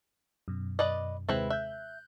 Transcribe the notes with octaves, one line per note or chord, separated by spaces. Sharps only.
F#2 B2
B4 D5 D#5
D#2 C3 G#3 C4 E4 B4
E5 F#6 G6